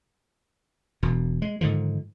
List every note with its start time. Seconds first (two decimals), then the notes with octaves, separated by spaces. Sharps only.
1.03 E1 B2
1.42 G#3
1.61 G#2 D3 D#3 F3